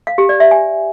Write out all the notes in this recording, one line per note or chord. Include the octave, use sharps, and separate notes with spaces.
F5
G4
D5
E5
G#5